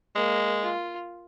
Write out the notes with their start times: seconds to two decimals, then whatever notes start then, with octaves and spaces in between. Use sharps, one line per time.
0.15 G#3 A#3
0.63 F4